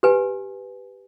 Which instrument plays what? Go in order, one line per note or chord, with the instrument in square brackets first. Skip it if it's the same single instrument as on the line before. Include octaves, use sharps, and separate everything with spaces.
[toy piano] G4 B4 G#5